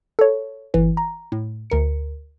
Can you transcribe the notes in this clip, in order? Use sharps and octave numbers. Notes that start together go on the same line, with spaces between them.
A4 C#5
G1 E3
A#5
A2
D2 A#4 C#7